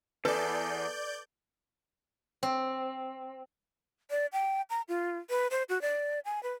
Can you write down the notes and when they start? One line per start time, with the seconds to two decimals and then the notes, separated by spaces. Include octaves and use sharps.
0.25 E2 A4 B4 D5 G6
2.43 C4
4.10 D5
4.33 G5
4.70 A#5
4.88 F4
5.30 B4
5.51 C5
5.69 F#4
5.81 D5
6.25 G#5
6.43 B4